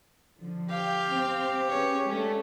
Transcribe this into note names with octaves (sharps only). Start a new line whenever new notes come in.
D3 F3
G4 F5 G5
C4
C#4 G#4 B4 C#5
G#3 A3 C#4 D4